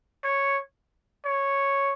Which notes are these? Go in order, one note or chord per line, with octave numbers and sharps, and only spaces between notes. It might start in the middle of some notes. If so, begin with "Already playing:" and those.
C#5
C#5